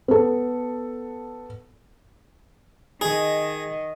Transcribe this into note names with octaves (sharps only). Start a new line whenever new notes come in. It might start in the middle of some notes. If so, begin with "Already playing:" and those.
B3 A4
D#3 G#4 D#5